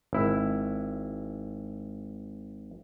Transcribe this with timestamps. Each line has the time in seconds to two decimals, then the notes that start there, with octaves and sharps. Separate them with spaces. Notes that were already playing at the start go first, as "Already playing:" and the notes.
0.13 G#1 E4